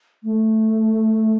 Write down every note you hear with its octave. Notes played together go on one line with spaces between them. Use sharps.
A3